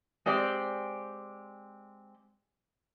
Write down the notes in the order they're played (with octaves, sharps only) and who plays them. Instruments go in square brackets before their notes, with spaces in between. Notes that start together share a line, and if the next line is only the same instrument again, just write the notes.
[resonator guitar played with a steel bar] G#3 C4 G4 D5